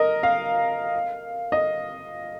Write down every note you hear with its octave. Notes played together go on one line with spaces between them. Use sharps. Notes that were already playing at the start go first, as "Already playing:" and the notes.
Already playing: A#4 D#5
F5
D#5